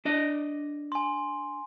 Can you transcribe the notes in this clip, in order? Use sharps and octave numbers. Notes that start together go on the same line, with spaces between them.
D4 D5 D#5
G#5 C6